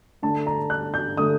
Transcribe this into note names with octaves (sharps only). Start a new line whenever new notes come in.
D3 A3 D4 A5
A#5
F#6
G6
D3 A3 D4 D#6